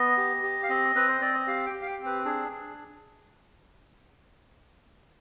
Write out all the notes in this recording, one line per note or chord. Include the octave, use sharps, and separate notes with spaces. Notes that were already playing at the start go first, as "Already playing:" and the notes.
Already playing: B3 D#5
G4
G4
F5
C4 D#5
C4 B4
C5
C4 D5
D#5
G4 F5
G5
G4
F5
G5
C4
B4
D4 G#4
D4